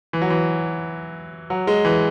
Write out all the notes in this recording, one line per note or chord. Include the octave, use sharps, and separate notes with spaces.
E3
F#3
E3
F#3
G#3
E3